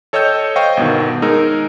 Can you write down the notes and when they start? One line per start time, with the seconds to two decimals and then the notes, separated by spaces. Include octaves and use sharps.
0.13 A4 C#5 D#5 G5 E6 G6
0.56 C5 D#5 F5 G5 C#6
0.77 G1 B2 D#3
1.22 G#3 D#4 A#4 E6